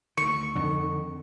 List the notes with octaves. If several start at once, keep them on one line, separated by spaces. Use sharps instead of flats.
D2 D#3 C#6
F2 D3 D#3